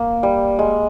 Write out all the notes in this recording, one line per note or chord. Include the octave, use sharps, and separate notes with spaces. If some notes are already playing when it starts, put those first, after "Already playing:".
Already playing: A#3
G3
G#3